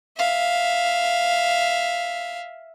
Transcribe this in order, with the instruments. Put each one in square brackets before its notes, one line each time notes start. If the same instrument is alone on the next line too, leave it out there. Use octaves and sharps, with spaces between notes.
[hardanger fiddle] E5 F5